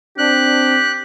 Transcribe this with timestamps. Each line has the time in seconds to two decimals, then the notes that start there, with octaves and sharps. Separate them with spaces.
0.18 C4 D4 G4 F#6